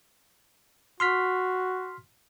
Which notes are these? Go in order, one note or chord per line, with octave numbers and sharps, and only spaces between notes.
F#4 C6 F6 B6